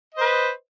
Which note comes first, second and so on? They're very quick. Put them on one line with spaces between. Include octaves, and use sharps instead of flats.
D#5 C5 B4